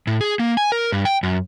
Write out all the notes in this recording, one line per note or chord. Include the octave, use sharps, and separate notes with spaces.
A2
G#4
A#3
G#5
A#4
G2
G5
F#2